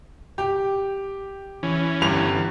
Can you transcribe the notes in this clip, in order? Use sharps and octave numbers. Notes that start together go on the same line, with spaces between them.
G4
E3 C#4
G1 G2 F7